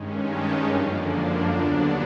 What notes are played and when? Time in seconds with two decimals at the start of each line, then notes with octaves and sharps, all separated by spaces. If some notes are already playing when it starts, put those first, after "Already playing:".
Already playing: G2 D#3 G#3 C#4
0.26 G5 A5
0.66 F#2 D3 F3 A#3 D4
1.06 F#5 G#5
1.46 D#2 D3 F#3 B3 D4 F5 G5